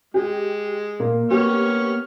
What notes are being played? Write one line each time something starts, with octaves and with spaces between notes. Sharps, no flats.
G#3 G4
A#2 A#3
A#3 B3 G4 C#5 C#6 F6